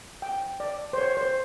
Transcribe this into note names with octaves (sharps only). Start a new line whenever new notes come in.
G5
D5
C5
C#5
C5